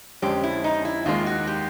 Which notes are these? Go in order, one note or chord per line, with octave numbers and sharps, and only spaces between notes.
F2 D3 F3 G#3 C#4 G4
E4
D#4
E4
D#2 D#3 G#3 F4
F#4
G4